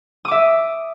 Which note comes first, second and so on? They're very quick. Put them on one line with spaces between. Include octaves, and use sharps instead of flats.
D#6 D6 E5